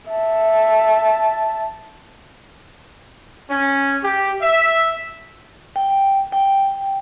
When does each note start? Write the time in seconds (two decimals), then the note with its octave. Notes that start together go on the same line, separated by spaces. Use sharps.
0.11 E5 A5
3.50 C#4
4.04 G4
4.42 E5
5.76 G5
6.32 G5